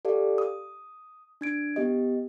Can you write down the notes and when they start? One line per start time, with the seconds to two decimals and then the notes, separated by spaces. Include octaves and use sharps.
0.05 G4 A4 D5 F5
0.38 D#6
1.41 D4 G#6 D7
1.76 B3 G4 D#5